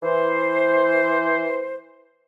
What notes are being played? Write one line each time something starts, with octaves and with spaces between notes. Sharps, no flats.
E3 C5